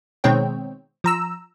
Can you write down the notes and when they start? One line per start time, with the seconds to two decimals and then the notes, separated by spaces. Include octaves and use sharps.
0.24 B2 D#3 G#3 C4 C#5 G5
1.04 F3 A#5 E6